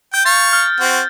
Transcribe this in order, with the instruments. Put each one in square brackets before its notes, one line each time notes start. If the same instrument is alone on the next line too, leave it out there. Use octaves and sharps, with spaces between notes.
[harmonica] G5 [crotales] G6
[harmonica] F5 C#6 [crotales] A6
[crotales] F6
[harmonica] C4 F#4